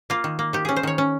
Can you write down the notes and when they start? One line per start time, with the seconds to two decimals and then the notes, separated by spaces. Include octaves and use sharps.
0.10 A#3 F4
0.24 D#3
0.39 A#3
0.53 D#3 G4
0.65 C#4 G#4
0.76 C5
0.83 D#3 C#5
0.98 C#4